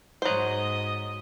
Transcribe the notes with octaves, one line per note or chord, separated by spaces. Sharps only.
G#2 F#3 C5 D#5 D#6